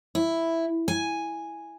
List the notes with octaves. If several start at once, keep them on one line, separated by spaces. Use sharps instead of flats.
E4
G#5